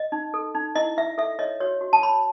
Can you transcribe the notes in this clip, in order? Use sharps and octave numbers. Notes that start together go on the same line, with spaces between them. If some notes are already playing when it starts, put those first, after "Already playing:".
Already playing: D#5
D#4
A4
D#4
E4 D#5
E4 E5
A4 E5
C#5 D#5
F#4 C#5
F#4
A5
C#5 B5